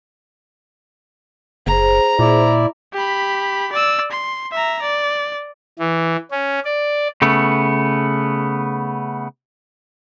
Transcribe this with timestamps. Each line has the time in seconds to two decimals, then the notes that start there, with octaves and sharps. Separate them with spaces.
1.67 F#1 G#4 C5 A#5
2.19 A#2 E4 D5
2.93 G4 B5
3.72 D5 E6
4.11 C6
4.52 E5 A#5
4.81 D5
5.79 E3
6.31 C#4
6.65 D5
7.22 C#3 A3 B3